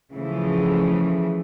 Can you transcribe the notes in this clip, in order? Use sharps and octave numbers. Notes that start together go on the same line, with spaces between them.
C#3 E3 F3 A3